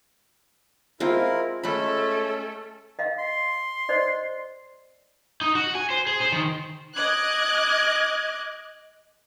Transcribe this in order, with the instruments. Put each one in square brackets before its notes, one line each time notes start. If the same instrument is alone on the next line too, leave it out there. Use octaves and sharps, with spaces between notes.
[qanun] G#3 C4 F4 [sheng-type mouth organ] E4 A#4
[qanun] G#3 B5 [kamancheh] A3 A4 [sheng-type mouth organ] C#4
[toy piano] D#5 F5
[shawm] C6
[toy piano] C5 D5 D#5
[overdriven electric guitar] D#4
F#4
G#5
C5
G#4
C5
D#3
[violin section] D#5 D6 F#6 G#6